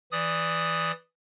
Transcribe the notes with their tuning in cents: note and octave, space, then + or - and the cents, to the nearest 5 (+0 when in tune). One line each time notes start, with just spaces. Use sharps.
E3 +0 D5 +0 D#6 +0